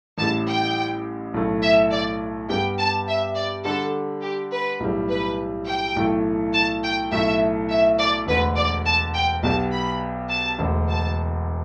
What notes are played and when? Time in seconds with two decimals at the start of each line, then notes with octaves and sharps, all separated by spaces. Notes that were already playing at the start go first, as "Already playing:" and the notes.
0.18 A1 A2 G3 A5
0.46 G5
1.34 B1 A2 A3
1.62 E5
1.91 D5
2.49 G2 G3 B3 G4 G5
2.78 A5
3.07 E5
3.35 D5
3.64 D3 G3 D4 A4
4.22 G4
4.51 B4
4.80 B1 A2 G3
5.09 B4
5.67 G5
5.96 B1 A2 E3 A3
6.53 A5
6.83 G5
7.12 B1 A2 A3 E5
7.70 E5
7.98 D5
8.27 E1 D2 D3 B4
8.56 D5
8.85 A5
9.14 G5
9.43 B1 B2 B3 G4 D5 A5
9.72 B5
10.29 A5
10.58 E1 D2 D3
10.88 A5